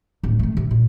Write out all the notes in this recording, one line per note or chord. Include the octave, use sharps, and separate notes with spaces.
D1
D#3 A3
C3
A#2